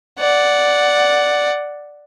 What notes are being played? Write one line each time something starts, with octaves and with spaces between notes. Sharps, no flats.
D5 F#5